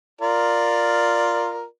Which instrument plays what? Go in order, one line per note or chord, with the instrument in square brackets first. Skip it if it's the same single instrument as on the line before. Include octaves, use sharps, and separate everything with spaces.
[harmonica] F4 A#4 D5